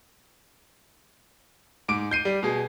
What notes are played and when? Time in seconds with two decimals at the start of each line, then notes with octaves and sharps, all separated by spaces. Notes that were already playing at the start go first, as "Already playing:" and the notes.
1.88 G#2 D6 D7
2.11 G6 C7 D#7
2.25 G3
2.43 B2 G#4